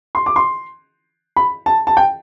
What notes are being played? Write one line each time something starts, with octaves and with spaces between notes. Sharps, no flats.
C6
D6
C6
B5
A5
A5
G5